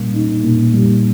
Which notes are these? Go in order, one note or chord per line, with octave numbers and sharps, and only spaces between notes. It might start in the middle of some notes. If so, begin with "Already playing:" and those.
Already playing: A#2 G3 A#3
D#4
A#2
G3